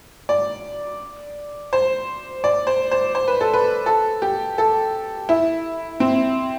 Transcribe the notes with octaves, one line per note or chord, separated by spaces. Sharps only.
D5
C5
D5
C5
C5
C5
B4
A4
B4
A4
G4
A4
E4
C4